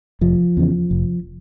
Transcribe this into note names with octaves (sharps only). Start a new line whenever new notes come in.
F1 F3
E2 C#3
F1